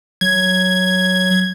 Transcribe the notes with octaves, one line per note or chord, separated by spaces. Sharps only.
F#3 G#6